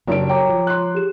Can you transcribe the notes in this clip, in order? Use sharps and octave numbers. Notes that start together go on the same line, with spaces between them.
F#1 F#3 D4 G4 A#4 D7
C#5 G5 A#5 D6
F3
C6 F#6
G4 G#4 E7